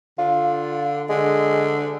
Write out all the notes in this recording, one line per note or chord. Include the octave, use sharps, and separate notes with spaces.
D3 F4
D3 G#3